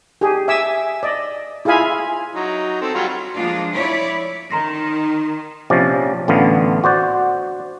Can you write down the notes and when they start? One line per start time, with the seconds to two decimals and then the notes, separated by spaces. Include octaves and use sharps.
0.21 G4 G#4
0.48 E5 G#5 D6 E6
1.03 D5 D#5
1.65 E4 F4 G#4 F5 G#5 B5
2.35 F#3 D#4
2.82 C4 A4
2.94 F#3 G3 F4
3.34 F3 G#3 A#3 D4 F4
3.72 E4 C#5 D5
4.51 D#3 A#5 C6 A#6
5.70 A#1 C3 F3 C#4 D5
6.28 A1 D3 B3 F4
6.84 F#4 C5 D5